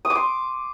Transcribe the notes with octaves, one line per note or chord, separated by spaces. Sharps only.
D#6
D6
C6